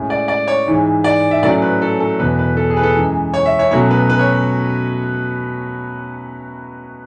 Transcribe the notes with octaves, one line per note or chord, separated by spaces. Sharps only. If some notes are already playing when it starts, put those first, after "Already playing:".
Already playing: A2 G#3 C#4
D5
D5
C#5
G#2 E3 G#3
D5
E5
A2 F#3 A3 C#4 D5
B4
A4
A4
E2 B2 A3 B4
B4
A4
G#4
B4
A4
F#2 E3 G#3
C#5
E5
C#5
B2 F#3 A3 C#4 C#5
B4
B4
C#5